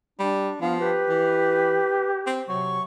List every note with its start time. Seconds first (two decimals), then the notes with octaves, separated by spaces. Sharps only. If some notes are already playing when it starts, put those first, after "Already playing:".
0.19 G3 D4
0.61 F3 B3 F5
0.80 G4 B4
1.09 E3
2.27 C4
2.49 C3 F#3 C#6